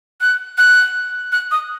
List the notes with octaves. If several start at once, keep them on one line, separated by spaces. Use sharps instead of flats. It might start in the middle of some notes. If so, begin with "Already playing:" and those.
F#6
F#6
F#6
D#6